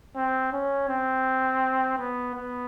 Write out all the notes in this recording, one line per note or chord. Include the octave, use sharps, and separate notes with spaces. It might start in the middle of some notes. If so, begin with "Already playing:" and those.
C4
C#4
C4
B3
B3